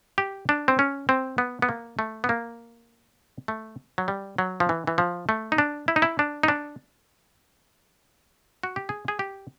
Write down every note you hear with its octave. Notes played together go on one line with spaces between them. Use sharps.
G4
D4
C4
C#4
C4
B3
B3
A#3
A3
B3
A#3
A3
F#3
G3
F#3
F3
E3
E3
F3
A3
D#4
D4
E4
D#4
E4
D4
D#4
D4
F#4
G4
G#4
G#4
G4